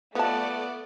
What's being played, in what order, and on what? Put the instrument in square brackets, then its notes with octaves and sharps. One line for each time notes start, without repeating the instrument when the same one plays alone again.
[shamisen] F3 A5 [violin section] A3 D5 [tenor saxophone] B3